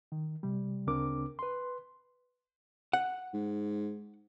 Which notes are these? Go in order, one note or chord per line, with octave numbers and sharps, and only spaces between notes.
D#3
C3 G3
D2 C#3 C4 D4 A#4 D6
B4 C6
F#5
G#2